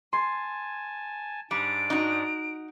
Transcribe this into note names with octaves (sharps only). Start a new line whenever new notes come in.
G#5 A5 C6
G#2 G3 D4 D5 D7
D#4 F#4